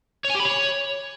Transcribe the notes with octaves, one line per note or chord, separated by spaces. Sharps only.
C#5
G#5
G4
B5
C#5